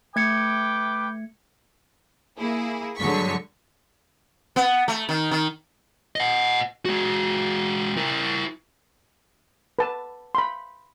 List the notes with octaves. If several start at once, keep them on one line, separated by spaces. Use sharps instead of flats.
A3 B4 G5 D6 G#6 C#7
A#3 E4 G#4
G2 D3 F#3 G#3 C#6 B6
B3
A3
D#3
D#3
D#5 F#5
G#3 F#4
E4 A#4
B4 A5
B5 C6